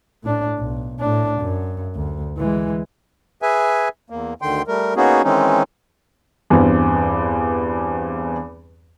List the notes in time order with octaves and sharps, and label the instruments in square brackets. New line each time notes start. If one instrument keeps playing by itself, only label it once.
[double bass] A2 D4
B1
A2 D4
F#2
D2
E3 G#3
[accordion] G#4 B4 E5 G#5
E2 A#3
D2 D3 D#3 G5 C6
G3 A3 A#4
A#3 B3 C#4 D#4 F#4 G#4
D#3 E3 G#3 C4 C#4 D#4
[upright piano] E2 G2 B3 C4